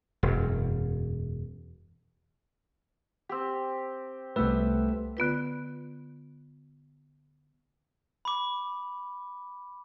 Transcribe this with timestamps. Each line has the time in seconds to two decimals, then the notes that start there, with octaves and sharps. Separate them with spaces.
0.23 E1 F#2
3.29 C4 G4
4.36 C2 A3 B3 G4 B4 E5
5.17 D3 B3 F4 B4
8.25 B5 D6